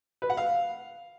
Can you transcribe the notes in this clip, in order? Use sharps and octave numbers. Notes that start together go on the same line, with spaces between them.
B4
F#5
F5